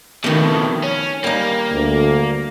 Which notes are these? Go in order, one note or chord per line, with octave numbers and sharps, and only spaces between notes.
F2 B2 D#3 A3
C#4
G3 A#3 D#4
D2